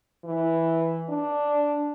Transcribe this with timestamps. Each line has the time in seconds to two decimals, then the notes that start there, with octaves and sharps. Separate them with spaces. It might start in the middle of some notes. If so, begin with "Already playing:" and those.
0.25 E3
1.09 D4